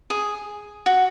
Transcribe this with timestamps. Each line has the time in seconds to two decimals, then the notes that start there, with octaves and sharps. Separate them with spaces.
0.10 G#4
0.86 F#4